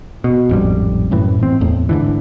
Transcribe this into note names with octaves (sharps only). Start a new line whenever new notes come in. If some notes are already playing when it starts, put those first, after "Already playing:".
B2
A1 F2 G#2 G3
F#2 A2 E3
G#2 C4
E2 A2
G#2 D3 E3